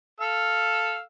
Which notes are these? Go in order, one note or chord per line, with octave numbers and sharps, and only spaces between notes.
A4 F5 E6